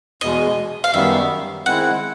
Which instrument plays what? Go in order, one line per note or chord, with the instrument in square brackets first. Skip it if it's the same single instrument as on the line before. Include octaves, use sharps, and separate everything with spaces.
[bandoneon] E2 B2 G#3 [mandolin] D#5
[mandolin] F5
[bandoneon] F#2 D#3 G3 B3 [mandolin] E5
[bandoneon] D#3 G#3 C4 E4 [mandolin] F#5